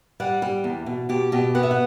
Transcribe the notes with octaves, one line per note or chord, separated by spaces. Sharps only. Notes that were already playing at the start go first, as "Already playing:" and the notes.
G3 F#5
G3
E2
B2
B2 G4
B2 G4
B3 F#5
E5
F#5